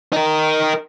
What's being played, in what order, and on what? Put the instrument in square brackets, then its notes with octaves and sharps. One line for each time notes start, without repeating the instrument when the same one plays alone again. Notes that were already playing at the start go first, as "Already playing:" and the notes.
[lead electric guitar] D#4 A#4